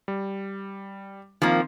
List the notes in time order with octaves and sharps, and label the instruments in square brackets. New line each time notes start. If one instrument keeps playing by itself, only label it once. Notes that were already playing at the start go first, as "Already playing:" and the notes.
[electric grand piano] G3
[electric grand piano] D#3 C4 [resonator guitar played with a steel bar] F3 A#3